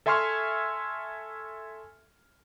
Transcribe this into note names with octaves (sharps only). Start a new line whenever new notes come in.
A4 E5 G#5 C6 C#6 F6